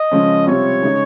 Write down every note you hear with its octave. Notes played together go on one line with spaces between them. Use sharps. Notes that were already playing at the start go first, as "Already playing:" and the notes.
Already playing: D#5
C#3 F3 G#3 C#4
C3 G3 C4 F4 C#5
C#3 G#3 D#4